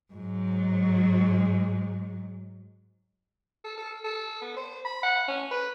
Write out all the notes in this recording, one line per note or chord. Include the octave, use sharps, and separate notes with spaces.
G#2 F#3
A4
A4
A4
B3
C5
B5
F#5
C#4
B4